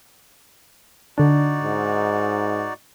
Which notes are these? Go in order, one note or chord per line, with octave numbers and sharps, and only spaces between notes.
D3 D4 D#4 F#4 D5
G#2